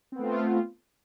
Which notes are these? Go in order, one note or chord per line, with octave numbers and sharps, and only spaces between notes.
A3 B3 C4 F4